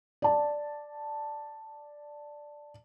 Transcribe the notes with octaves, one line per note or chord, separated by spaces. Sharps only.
D5 A5